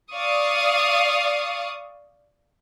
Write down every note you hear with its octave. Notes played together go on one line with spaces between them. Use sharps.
D5 F5 C#6 D#6